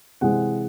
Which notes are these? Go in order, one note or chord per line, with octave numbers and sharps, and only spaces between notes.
C3 E3 G#3 C4 F#5